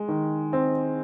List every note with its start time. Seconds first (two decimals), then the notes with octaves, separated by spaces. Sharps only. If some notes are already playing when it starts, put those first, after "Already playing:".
Already playing: G#3
0.08 D#3
0.53 C4